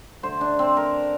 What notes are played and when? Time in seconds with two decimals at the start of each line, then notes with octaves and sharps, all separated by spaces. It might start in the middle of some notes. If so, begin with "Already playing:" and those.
0.23 D3 A3 C5
0.41 D4
0.59 C4
0.77 A#4